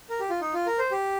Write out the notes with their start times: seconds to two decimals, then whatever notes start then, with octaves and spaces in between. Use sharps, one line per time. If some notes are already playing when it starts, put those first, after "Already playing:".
0.10 A#4
0.20 G4
0.30 F4
0.41 D#4
0.54 F4
0.66 A#4
0.79 C5
0.92 G4